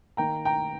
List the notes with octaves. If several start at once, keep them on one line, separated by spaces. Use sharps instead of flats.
D#3 A#3 G5 A#5
G5 A#5